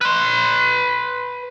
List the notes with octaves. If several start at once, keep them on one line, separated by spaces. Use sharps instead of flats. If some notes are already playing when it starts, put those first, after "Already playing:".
B4 C6